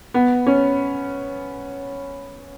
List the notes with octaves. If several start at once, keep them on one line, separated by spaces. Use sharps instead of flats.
B3
C#4